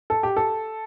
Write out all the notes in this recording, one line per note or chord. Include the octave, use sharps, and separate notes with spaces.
A4
G4
A4